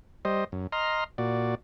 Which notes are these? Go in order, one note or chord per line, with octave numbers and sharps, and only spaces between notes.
G3 C5 D#5
F#2
D#5 A#5 C6 F6
A#2 F#4 D5